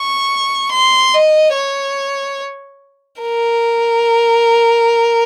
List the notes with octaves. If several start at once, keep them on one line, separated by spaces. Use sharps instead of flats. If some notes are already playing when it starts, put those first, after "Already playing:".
Already playing: C#6
C6
D#5
C#5
A#4